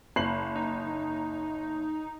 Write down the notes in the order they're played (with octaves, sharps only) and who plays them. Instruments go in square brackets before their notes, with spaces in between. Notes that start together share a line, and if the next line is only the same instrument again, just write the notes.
[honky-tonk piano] F#1 C7 F#7
[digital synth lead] D#4